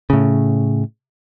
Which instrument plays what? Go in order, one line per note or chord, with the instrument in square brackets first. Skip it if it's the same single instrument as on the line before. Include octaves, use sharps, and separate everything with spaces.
[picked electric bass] A2 C#3